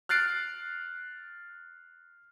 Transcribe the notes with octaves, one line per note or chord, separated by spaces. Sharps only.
F6 F#6 A6 C7 D7